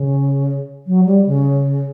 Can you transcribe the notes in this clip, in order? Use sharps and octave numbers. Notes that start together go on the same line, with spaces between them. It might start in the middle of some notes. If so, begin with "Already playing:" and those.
Already playing: C#3
F#3
G3
C#3